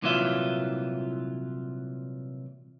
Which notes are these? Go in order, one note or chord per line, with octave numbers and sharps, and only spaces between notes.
C2 A#2 E3 F#3 F4 E5